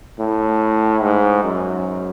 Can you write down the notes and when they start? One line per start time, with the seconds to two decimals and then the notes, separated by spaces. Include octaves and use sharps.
0.19 A2
1.02 G#2
1.44 F#2